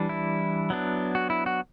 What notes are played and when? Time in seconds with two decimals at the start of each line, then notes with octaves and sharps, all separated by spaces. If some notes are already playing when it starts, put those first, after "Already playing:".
Already playing: E3 G3 D4
0.09 E4
0.70 F#3 B3 D4
1.15 F#4
1.30 E4
1.46 F#4